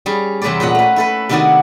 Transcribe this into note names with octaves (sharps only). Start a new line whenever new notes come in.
G3 C#4 G#4
E2 C3 C4 B4 C#5 D5
A#2 C#4 D#5 F#5
A3 B4
E4 A4 B4
C3 D#3 B3 D4 F#4 D5